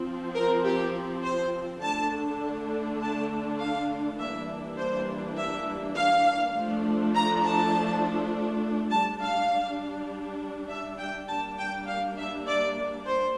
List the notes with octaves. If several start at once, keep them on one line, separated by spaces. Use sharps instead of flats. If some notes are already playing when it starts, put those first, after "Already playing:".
Already playing: F3 C4
A#4
G4
C5
D3 A3 D4 A5
A5
F5
E3 G3 A#3 D4 E5
C5
E5
F5
F3 A3 D4
A#5
A5
G3 D4 A5
F5
E5
G5
G3 A#3 D4 A5
G5
F5
E5
D5
C5